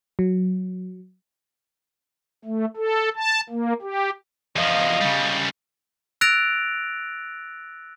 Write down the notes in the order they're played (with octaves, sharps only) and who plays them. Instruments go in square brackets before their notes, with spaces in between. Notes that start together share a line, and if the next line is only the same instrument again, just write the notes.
[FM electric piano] F#3
[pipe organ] A3
A4
A5
A#3
G4
[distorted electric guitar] E2 F3 [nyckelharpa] D#5 F5
[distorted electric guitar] C#3 G3
[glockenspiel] E6 F#6 A6 A#6 D7 F7